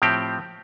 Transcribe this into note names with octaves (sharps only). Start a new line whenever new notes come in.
A2 F3 C4 G4